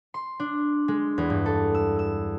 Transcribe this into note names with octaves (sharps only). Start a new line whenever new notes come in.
C6
D4
G#3
E2
G2
A4
E6
E6